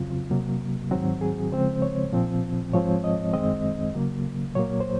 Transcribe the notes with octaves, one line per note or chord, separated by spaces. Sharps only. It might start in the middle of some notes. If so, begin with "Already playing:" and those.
Already playing: F2 C#3 F#3 C4 F4
C3 F#3 A#3
G#2 D#3 F#3 C4 F#4
G#4
C#3 F3 G#3 C4 C5
C#5
A#2 F3 C4
G#2 F3 G#3 C4 C#5
D#5
F#2 D#3 G#3 C4 D#5
C#3 F#3 A#3
A#2 F#3 A#3 C#5
C5